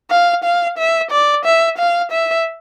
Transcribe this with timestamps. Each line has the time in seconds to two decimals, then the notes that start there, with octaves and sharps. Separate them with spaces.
0.11 F5
0.44 F5
0.78 E5
1.11 D5
1.45 E5
1.78 F5
2.11 E5